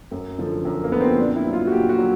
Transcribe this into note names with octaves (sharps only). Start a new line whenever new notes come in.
F#2
D3 F3
F#2
A#3
D3 F3 B3
C4
A#2 D4
E4
F#3
F4
F#4
A#2 G4
F#4
F#3